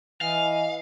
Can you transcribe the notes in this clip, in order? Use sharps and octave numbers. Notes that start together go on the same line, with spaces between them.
E3 D#5 F5 G#5